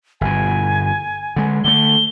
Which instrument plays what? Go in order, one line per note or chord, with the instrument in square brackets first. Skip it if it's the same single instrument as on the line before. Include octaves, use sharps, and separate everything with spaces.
[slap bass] G1 B2 [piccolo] G#5
[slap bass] D3 G#3
[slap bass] D3 A3 [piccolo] G7